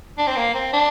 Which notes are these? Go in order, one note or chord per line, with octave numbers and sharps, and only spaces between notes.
D4
C4
A#3
C4
D4